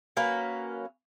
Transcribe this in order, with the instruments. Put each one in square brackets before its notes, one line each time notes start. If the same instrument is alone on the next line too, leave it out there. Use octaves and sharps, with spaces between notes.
[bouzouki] F#3 A#3 C#4 B4